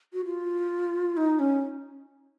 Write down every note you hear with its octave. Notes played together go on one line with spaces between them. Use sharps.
F#4
F4
D#4
C#4